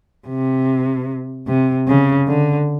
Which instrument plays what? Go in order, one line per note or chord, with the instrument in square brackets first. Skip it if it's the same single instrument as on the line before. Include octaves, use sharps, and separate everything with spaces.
[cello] C3
C3
C#3
D3